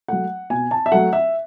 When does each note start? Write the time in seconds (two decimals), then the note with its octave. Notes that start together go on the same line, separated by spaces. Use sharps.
0.08 F#3 A3 F#5
0.50 B2 G#5
0.71 A5
0.86 E5
0.92 F#3 A3 F#5
1.13 E5